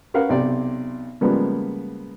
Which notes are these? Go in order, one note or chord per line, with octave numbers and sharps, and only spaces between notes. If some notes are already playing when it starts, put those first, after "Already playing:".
C#4 A#4 B4 F5 F#5
B1 C3 D5 G5
C#3 F3 G3 G#3 A#3 B3